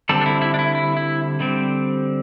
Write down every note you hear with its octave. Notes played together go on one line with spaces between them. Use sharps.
D3 G3 C4 A4
D4
E4
E4
D4
E4
E4
E4
D3 G3 C4